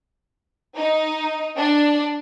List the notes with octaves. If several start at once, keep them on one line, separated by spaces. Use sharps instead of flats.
D#4
D4